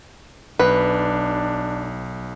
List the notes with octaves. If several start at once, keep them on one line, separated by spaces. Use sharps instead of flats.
B1 D4 B4